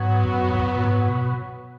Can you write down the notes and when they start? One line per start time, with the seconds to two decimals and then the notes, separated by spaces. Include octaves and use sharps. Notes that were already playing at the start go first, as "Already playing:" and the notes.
Already playing: G#2 F#3 B3 F#4
0.24 F#2
0.49 G#2
0.60 F#2
0.75 A2
0.84 G#2
1.08 B2